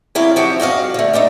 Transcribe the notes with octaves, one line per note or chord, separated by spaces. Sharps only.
C3 F#3 E4 G4 F5
F3 C4 F#4 G4 E5
G2 F#4 D#5 F5
D3 A3
G3 A3 D4 D#4